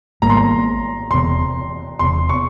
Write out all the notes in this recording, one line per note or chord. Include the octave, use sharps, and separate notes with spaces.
G#1 G#2 G3 A#3 A#5
C6
A#5
E1 E2 C3 C6
E1 E2 C3 C6
C#6